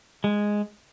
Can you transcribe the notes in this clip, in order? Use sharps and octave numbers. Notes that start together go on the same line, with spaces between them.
G#3